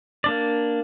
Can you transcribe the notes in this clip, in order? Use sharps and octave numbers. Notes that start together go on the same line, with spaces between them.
A#3 D4 D5